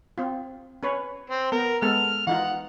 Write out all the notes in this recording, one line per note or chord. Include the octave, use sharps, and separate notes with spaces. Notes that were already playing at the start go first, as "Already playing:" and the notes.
C4 F4
C#4 B4 C#5
C4
B3 A#4
G#3 B3 A4 F6
E3 D#4 F4 F#5